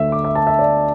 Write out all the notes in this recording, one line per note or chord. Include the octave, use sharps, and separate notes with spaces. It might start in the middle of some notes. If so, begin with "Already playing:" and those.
Already playing: D2 D3 A3 E5
D6
E5
A5
E5
D5